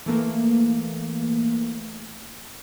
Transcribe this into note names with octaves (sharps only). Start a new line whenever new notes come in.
E3 A3 A#3